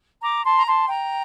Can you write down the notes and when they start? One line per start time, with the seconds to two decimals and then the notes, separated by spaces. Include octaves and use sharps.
0.23 A#5 D6
0.45 A5 C6
0.57 A#5
0.67 A5 C6
0.88 G5 A#5